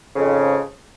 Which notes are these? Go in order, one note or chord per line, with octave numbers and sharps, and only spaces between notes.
F2 G#2 C#3